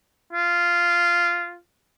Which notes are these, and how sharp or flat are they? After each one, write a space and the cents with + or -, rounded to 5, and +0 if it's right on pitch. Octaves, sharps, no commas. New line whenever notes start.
F4 -10